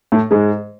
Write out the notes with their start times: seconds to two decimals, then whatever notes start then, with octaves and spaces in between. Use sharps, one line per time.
0.12 A2 A3
0.31 G#2 G#3